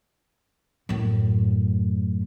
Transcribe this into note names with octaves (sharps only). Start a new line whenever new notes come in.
F#2 A2